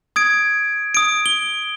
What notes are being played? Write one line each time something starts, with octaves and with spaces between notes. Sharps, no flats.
D#6 G#6 D7
D#6 D7
G7